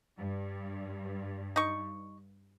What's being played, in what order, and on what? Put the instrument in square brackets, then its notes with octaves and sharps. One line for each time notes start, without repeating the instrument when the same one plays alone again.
[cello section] G2
[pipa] D#4 C#6